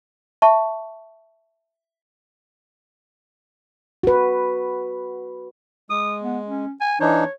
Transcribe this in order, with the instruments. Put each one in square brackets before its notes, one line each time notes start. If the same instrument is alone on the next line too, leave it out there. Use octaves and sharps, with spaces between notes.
[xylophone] E5 A5 C#6
[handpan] F#4 B4
[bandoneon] G#3 [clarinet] D#6
[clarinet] B3
C#4
G#5
[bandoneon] E3 D4 D#4 [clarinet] C#5